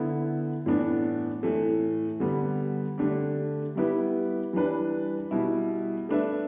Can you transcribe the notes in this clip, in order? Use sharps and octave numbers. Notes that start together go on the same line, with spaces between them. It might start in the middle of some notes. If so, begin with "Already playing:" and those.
Already playing: D3 B3 E4
A2 E3 B3 D4
A2 E3 A3
D3 G3 B3
D3 A3 D4 G4
G3 B3 E4 G4 B4
E3 G3 D4 B4
B2 G3 E4
A3 D4 B4 E5